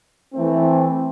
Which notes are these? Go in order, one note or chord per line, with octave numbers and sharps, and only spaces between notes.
E3 A3 C4